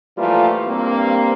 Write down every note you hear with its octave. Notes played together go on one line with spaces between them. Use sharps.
E3 F3 G3 A3 A#3 F4
G2 A#3 C4